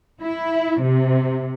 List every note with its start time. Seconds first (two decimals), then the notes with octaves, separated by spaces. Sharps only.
0.22 E4
0.81 C3